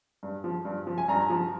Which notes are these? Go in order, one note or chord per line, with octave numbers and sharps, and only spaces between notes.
G2
F3
G2
F3
G#5
G2 A#5
F3